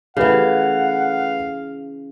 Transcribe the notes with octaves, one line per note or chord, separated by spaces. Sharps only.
C#3 E3 A3 G4 B4 F5 F#5